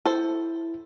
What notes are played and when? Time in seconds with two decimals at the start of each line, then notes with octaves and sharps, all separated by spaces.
0.06 E4 A4 C5